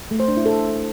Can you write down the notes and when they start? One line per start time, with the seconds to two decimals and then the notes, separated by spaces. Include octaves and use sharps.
0.11 A3
0.20 C5
0.28 D4
0.37 E4
0.46 A4